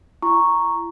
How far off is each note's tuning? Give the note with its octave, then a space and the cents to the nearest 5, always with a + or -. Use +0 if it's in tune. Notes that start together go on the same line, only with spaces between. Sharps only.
E4 +40 A#5 +0 C#6 +0